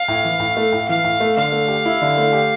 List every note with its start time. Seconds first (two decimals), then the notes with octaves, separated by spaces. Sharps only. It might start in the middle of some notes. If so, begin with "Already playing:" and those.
Already playing: F5
0.08 A2
0.24 E3
0.40 A2
0.57 A3
0.72 A2
0.89 E3 F5
1.04 A2
1.20 A3
1.37 D3 F5
1.52 A3
1.68 G4
1.86 E4
2.02 D3
2.18 A3
2.33 G4